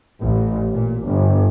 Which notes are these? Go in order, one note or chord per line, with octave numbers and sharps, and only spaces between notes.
A1
A#2
G1